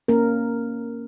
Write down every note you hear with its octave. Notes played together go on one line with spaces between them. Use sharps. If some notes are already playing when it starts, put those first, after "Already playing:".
A#3 C#4 A#4